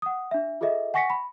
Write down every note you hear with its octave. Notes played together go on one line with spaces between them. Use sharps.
F#5 D#6
D4 E5
F4 G#4 A4 D#5 E5
F#5 G#5 C#6 A#6 B6 C#7
B5